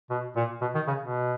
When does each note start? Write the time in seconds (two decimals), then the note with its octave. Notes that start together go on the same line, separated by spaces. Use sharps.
0.10 B2
0.36 A#2
0.61 B2
0.75 D#3
0.87 C#3
1.00 B2